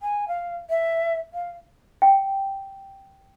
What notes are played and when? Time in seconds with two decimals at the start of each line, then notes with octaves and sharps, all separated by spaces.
0.02 G#5
0.28 F5
0.70 E5
1.34 F5
2.02 G5